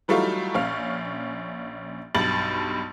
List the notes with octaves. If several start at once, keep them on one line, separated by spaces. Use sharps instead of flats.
E3 F#3 G3 A3 D#4 F4
A#1 C#4 F5 F6
B1 G2 A6 F#7